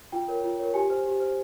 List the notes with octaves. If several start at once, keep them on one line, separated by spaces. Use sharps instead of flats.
F4 G5
A#4 C#5
F4
A#4 C#5
G4 G#5
C5
G4
C5